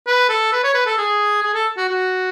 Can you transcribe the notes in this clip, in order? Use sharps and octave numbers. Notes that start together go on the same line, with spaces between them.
B4
A4
B4
C#5
B4
A4
G#4
G#4
A4
F#4
F#4